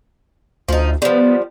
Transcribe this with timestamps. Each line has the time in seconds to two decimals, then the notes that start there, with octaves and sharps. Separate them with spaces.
0.69 D2 F3 D#4
1.02 F3 G3 B3